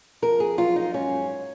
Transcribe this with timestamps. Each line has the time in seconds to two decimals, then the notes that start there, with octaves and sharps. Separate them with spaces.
0.22 F2 A#4
0.40 G#4
0.58 F#3 F4
0.76 D#4
0.94 G#2 C#4